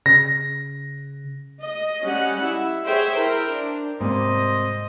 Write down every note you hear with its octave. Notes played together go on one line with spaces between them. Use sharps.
C#3 A#6
D#5
G3 C#4 G4 D#5 F#5
E4 E5
G#4 C5 C#5 E5 G5
E4 A#4 C5 G5
D4
G#2 C3 G3 A#3 C5 D#5